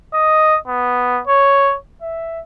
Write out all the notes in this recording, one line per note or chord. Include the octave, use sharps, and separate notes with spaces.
D#5
B3
C#5
E5